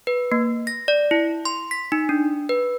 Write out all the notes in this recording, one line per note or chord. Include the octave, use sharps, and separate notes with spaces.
B4
A#3
A#6
D5
E4
C6
B6
D#4
D4
B4